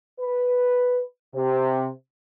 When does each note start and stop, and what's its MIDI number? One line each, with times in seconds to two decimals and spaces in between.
0.19 1.00 71
1.35 1.87 48